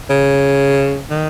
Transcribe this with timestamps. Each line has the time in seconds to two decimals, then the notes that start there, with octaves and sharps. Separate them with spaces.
0.10 C#3
1.10 D#3